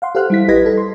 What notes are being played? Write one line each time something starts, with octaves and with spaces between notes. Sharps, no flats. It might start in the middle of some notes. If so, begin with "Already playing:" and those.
F5 F#5 C6
G4 A4 C5 F5 F6 F#6
G3 E4 B6
A1 G4 B4 D#5 G#6 A#6
A4
C6